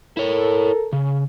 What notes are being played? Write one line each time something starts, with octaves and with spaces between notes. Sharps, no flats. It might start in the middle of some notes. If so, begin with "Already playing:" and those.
E4 A4 A#4 C#5
C#3